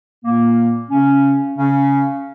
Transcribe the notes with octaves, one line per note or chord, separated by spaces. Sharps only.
A#2 A#3
C#3 C#4
C#3 C#4